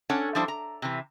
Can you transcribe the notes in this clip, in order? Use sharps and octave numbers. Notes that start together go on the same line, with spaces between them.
C#4 D4 A4 C#5 F#5
F3 G3 D4 E4 C5 A5
A#5
C3 E3